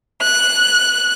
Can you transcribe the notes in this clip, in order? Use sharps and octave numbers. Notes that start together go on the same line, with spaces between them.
F#6